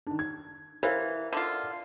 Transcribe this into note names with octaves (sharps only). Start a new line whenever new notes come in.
D#3 D4
G#6
E3 A#4 C5 F5
D3 F4